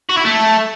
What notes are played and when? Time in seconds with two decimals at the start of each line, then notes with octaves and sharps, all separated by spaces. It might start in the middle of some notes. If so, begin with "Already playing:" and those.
0.09 F#4
0.17 E4
0.25 A3